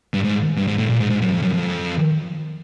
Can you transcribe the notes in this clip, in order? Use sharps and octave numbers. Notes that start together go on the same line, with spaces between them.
G2
G#2
G2
G#2
A2
A#2
G#2
G#2
F#2
F2
F#2
F2